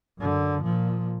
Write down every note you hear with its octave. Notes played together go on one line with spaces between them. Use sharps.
F#2 D3
A#2 F3